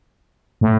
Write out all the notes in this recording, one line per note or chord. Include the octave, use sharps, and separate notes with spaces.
A2